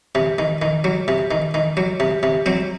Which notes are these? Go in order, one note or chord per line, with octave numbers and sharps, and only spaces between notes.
C3
D#3
D#3
F#3
C3
D#3
D#3
F#3
C3
C3
F#3 C4